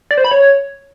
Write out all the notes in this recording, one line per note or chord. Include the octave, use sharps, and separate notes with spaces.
D5
C5
B5
C#5